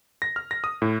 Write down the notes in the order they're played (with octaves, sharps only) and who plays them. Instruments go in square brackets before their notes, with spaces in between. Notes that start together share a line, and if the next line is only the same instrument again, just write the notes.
[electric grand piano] A#6
F6
A#6
D#6
A2